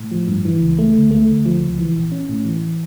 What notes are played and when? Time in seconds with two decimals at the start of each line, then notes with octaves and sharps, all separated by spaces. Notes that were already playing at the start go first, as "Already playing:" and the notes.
Already playing: A2
0.11 F3
0.28 G2
0.45 E3
0.61 C#2
0.78 A3
0.95 D2
1.11 A3
1.28 D2
1.45 F3
1.61 C#2
1.78 E3
1.95 A#1
2.12 C#4
2.29 A2
2.45 E3